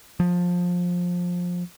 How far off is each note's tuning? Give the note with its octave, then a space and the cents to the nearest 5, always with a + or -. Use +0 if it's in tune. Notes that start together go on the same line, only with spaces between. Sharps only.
F3 +20